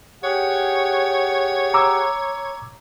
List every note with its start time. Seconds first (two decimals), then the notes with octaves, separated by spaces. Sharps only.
0.23 G4 G#4 C#5 F#5
1.74 A#5 D6 E6